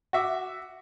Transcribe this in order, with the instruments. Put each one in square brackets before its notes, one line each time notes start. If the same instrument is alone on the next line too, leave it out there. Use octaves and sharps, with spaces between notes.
[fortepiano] F#4 E5 D6